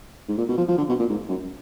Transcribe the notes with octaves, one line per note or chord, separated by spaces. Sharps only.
G#2
A#2
B2
F3
F3
D3
B2
A#2
G#2
F#2